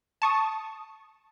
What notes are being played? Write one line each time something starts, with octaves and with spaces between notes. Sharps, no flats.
A5 C#6 D#6